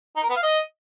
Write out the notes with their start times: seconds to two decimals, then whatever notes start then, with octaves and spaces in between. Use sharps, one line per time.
0.16 D#4
0.23 A#4
0.30 B3
0.36 F5
0.43 D#5